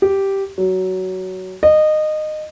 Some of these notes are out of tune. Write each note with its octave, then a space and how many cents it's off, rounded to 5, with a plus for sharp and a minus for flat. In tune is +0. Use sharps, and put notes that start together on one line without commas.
G4 -5
F#3 +15
D#5 -20